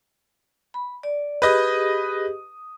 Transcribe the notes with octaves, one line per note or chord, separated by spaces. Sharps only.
B5
D5
G4 G#4 B4 D#5 D#6